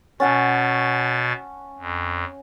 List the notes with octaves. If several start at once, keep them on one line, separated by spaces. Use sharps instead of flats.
B2 C#4 F#5 A5 A6
F2